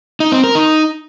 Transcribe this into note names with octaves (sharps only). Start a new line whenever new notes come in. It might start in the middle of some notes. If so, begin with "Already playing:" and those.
D#4
C4
A#4
D#4